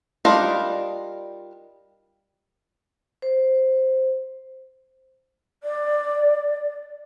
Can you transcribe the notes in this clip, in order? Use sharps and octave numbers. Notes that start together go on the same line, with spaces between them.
G3 D4 D#4 F4 A#4
C5
D5